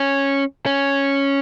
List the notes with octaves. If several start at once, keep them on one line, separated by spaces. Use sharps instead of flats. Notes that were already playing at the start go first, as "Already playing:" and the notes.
Already playing: C#4
C#4